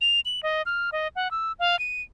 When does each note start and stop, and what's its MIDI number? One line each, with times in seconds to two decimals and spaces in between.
0.01 0.20 101
0.25 0.41 102
0.43 0.62 75
0.66 0.90 89
0.92 1.08 75
1.16 1.30 78
1.31 1.52 88
1.59 1.79 77
1.79 2.01 99